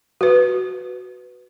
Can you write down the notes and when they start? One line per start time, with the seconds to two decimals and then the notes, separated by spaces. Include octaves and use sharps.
0.21 F#4 B4